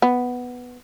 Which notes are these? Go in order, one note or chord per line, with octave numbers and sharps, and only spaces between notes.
B3